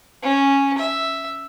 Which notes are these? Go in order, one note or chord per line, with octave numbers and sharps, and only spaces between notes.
C#4
E5